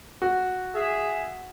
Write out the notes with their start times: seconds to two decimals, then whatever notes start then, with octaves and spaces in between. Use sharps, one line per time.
0.22 F#4
0.75 G#4 E5